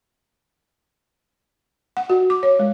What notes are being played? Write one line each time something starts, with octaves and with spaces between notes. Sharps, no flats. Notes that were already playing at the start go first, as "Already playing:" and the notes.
F#5
F#4
D6
C#5
G#3